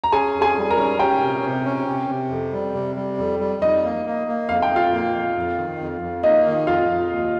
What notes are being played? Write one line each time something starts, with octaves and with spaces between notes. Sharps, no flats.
A#5
C#4 G#4 G#5
F2
G#4 G#5
G3
A#4 A#5
C#4
C#4 G4 G5
C3
C3
C#4
C3
C3
F2
G3
C3
G3
F2
G3
F2 D#4 D#5
A#3
A#3
A#3
F2 F5
G5
F2
F4 F5
A#3
F2
F2
D#3
F2
F2
A#3 D#4 D#5
D#3
F2 F4 F5
F2
D#2